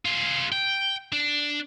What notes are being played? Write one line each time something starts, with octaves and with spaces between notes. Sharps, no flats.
F4 G#4
G5
D4